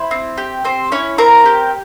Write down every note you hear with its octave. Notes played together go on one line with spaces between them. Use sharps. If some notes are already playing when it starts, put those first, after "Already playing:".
Already playing: E4 C5
C4
G4
C4 C5
C#4 E4 C#5
C4 A#4 A#5
G4